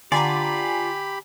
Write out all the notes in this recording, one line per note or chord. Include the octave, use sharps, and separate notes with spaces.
D3 F4 G4 D5 G#5 A#5 B5